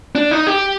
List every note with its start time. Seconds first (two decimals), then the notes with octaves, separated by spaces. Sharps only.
0.15 D4
0.31 D#4
0.47 G4